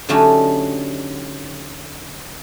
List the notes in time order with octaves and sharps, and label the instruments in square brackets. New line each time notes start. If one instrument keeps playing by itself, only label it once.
[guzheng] D3 F#3 A3 C#4 D#4 G4